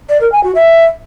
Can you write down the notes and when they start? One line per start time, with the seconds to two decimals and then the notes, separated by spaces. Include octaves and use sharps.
0.09 D5
0.21 A#4
0.32 G#5
0.43 F#4
0.55 E5